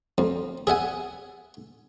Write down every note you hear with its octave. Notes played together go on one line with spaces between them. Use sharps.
F2
G#4 E5 F#5 G#5